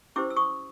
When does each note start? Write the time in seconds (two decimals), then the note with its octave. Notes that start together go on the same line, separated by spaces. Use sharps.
0.16 C#4 E4 G4 C5 D6 E6
0.30 E6
0.36 C#6 D#6